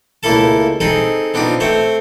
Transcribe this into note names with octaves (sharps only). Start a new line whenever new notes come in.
C#2 A3 A#3 E4 A4 A5
C4 D#4 G#4 A4
B3 C4 D4 D#4 F4
A3 C4 C5 C#5